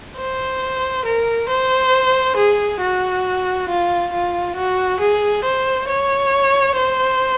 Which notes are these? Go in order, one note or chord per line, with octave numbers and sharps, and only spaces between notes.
C5
A#4
C5
G#4
F#4
F4
F4
F#4
G#4
C5
C#5
C5